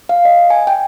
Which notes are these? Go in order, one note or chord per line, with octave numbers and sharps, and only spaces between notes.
F5
D#5
G#5
G5